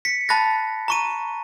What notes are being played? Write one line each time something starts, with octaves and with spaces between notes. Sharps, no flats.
B6 C#7
A5 B5 F#6 A6 A#6
A#5 C#6 D#7